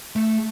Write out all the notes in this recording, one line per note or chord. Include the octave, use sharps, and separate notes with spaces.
A3